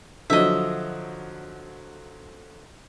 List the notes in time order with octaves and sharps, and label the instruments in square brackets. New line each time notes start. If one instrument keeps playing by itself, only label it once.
[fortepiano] D3 F3 F#3 [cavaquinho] D#5 E5